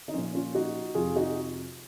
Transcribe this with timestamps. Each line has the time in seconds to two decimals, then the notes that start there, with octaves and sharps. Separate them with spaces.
0.08 D#4
0.14 A#2 F3 C#4 F4
0.35 C#4 F4
0.54 D#4 F#4
0.95 F2 C3 F3 F4 G#4
1.16 D#4 F#4